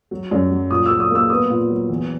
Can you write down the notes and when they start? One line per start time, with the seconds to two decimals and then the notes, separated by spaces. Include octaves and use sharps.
0.11 F#3
0.31 F#2
0.51 F#3
0.71 A#2 D#6
0.86 F#3 E6
1.00 D#6
1.11 A#3 E6
1.30 B3 D#6
1.50 A#2
1.70 F#3
1.89 E2